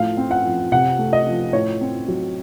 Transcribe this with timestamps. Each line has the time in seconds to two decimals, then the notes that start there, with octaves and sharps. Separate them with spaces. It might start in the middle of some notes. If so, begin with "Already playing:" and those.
Already playing: A2 F3 F5
0.17 C4
0.31 F#5
0.45 F3
0.72 C3 F#5
0.99 A3
1.13 D#5
1.26 F3
1.53 A2 C#5
1.81 C4
2.08 F#3